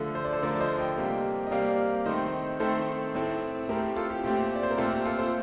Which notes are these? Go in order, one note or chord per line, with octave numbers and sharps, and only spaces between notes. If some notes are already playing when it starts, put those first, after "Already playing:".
Already playing: D3 F3 A3
C5
D5
A4 C5
D3 F3 A3 A#4 D5
C5 D#5
D#5 G5
C3 G3 A#3
D#5
C3 G3 A#3 D5 F5
D#3 A3 C4 C5 D#5
D#3 A3 C4 A4 C5
A2 A3 C4
A2 A3 C4 G4 A#4
G4
F4 A4
G4
A#2 A3 C4 G4
D5
C5
A#4
A#2 A3 C4 F4 A4
G4
F4 A4
A4 C5